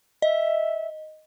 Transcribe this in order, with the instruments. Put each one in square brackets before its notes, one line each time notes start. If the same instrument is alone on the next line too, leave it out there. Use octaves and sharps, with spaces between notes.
[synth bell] D#5 [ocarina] E5